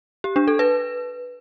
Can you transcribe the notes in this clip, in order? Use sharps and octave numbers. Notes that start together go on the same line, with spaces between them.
G4
D4
A4
B4